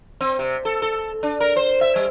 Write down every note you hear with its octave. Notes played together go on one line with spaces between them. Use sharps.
C4
C3
A4
A4
D4
A#4
C5
E5
G3